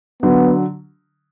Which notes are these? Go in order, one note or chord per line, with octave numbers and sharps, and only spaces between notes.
D3 F#3 B3